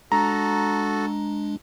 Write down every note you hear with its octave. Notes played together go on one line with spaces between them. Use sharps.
G#3 D4 F#4 A4 A#5